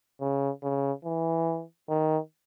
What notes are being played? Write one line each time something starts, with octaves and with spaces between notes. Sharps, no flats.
C#3
C#3
E3
D#3